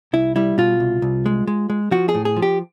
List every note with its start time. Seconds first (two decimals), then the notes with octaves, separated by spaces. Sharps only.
0.13 C2 E4
0.36 G3 E4
0.58 B2 F4
0.80 C2
1.02 C2
1.26 G#3
1.47 G#3
1.70 G#3
1.91 F3 F#4
2.09 G#4
2.14 A2
2.25 G#4
2.36 F3
2.42 G4